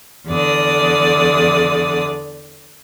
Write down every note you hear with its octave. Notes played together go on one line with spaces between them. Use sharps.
E2 D3 D5 D#6